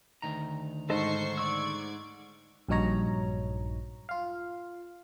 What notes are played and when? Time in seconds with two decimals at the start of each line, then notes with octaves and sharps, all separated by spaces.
0.22 D2 D#3 A#5
0.90 G#2 A4 C5 D#5 A5 C#6 C7
1.38 D5 C#6 E6 G#6
2.69 A#1 G2 F#3 D#4 C#5 A#5
4.09 F4 F5